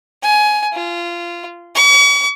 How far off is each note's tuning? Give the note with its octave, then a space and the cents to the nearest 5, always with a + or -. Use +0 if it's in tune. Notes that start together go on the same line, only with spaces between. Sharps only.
G#5 +15
F4 -20
C#6 +45